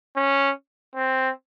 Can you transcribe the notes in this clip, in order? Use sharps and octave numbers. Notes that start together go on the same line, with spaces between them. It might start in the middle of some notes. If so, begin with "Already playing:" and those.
C#4
C4